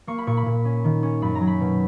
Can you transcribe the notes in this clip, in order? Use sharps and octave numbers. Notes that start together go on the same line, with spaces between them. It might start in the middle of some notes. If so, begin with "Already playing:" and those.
A#3 C#6
B5
A#2 C#6
B5
A#2
C#4
D#3
C#4
F#2 B5
A#5
F#3
B5
B2